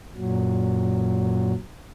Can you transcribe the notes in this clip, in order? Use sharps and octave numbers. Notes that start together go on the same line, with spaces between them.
F#2 A#2 F#3